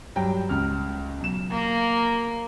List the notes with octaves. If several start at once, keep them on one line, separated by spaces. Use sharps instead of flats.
G2 F#3 G5
C#2 F6
B1 E7
A#3